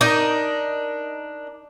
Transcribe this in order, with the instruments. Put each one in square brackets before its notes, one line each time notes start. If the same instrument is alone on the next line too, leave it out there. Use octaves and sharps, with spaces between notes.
[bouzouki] D4 D#4 A#4